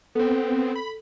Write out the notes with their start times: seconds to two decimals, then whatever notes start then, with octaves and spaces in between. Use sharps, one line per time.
0.15 B3 C4 A4
0.75 B5